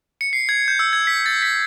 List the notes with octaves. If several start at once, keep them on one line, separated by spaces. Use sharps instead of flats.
C#7
C7
G#6
G6
E6
G#6
B6
A6
B6